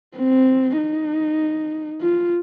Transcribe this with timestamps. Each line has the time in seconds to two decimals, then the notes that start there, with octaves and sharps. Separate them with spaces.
0.17 C4
0.77 D#4
2.01 F4